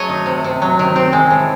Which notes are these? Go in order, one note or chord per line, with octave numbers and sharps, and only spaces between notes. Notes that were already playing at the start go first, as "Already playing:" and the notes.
Already playing: F#3 A3 C#5 D#5
D#3
C3
C3
F#3
D#3
C4
G#3
A2